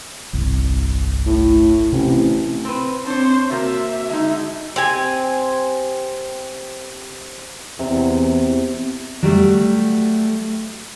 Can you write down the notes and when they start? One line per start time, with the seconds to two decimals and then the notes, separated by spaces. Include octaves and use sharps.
0.33 G1 C2
1.26 A2
1.92 A1 C3
2.65 C4 B4
3.07 C4 D4 C5 C#5
3.51 C3 A#3 F#4 E5
4.09 D3 G#3 D#4
4.76 C4 G4 G#5
7.79 E2 C3 A#5
9.23 F#3 G3 A3